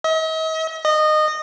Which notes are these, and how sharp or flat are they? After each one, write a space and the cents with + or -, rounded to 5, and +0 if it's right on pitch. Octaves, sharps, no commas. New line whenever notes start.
D#5 +45
D#5 -20